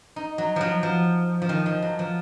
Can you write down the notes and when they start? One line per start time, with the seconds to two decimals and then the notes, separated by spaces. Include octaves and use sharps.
0.16 D#4
0.38 F#3
0.56 F3 F#3
0.83 F3
1.42 F3
1.49 D#3
1.66 F3
1.82 F#3
1.99 F3